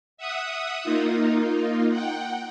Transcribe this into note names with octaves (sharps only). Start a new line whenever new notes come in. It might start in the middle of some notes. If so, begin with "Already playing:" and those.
E5 F#5 D#6
A#3 D#4 F4
F#5 G5